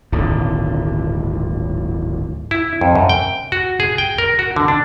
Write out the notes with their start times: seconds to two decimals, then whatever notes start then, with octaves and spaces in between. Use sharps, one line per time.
0.12 D1 G#1 A#2 D3
2.51 E4
2.81 F2
2.95 F#2
3.09 G5
3.52 F#4
3.80 G#4
3.98 G5
4.18 A#4
4.39 F#4
4.56 D3
4.68 D4